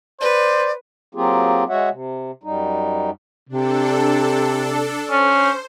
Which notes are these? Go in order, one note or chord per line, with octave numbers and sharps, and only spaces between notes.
B4 C5 D5
F#3 A#3 C4 F4 G4 G#4
G#3 F#4 C#5 E5 F#5
C3
F#2 G3 D#4
C3 D4 A4
C#4 C5